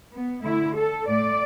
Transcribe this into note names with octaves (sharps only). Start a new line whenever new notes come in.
B3
D3 A3 E4
A4
A2 A3 D5